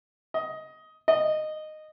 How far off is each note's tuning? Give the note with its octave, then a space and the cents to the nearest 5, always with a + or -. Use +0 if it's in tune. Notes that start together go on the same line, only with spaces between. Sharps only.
D#5 +15
D#5 -10